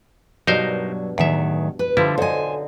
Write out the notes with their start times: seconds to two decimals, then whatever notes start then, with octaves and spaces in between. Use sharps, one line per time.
0.47 G2 B2 F#3 D4 D#4 A#4 C5
1.18 E2 A2 D#3 F#3 E5
1.79 B4
1.97 D3 F3 G3 C4 E4
2.18 B1 D3 D#4 C5 G#5